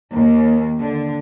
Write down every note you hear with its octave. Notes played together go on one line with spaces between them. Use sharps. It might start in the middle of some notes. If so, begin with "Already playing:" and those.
D#2
D3